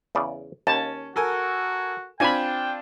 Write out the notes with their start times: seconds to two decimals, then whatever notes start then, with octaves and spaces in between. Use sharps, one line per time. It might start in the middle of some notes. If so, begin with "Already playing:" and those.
0.15 E2 C#3 D5
0.67 D#2 C#4 A5
1.16 F#4 A4 A#4 G#5
2.20 C4 D4 F4 G5 G#5 B5